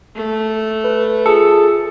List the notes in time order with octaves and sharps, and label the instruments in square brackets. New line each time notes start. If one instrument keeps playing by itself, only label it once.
[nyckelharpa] A3
[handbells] B4
[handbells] F4 G#4 C#7 [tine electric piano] A4